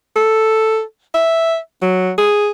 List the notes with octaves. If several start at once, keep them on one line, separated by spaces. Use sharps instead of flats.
A4
E5
F#3
G#4